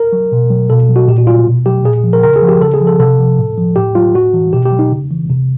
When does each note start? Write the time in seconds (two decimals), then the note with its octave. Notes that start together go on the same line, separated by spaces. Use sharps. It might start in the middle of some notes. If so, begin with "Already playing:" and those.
Already playing: A#4
0.13 F#3
0.32 B2
0.50 F#3
0.70 B2 A4
0.89 F#3
0.96 F#4
1.08 A#2 G4
1.18 F#4
1.27 F#3 F4
1.46 B2
1.66 F#3 G4
1.84 A#2 G#4
2.04 F3
2.13 A#4
2.23 C#3 A#4
2.36 G#4
2.42 F3
2.48 G4
2.61 C#3 A4
2.74 G#4
2.81 F3
2.87 A4
3.00 C3 A4
3.19 F3
3.39 A2
3.58 F3
3.76 A2 G4
3.95 F#3 F4
4.15 A2 F#4
4.34 E3
4.53 B2 G4
4.65 G4
4.72 F#3
4.79 D#4
4.91 C#3
5.11 E3
5.30 C3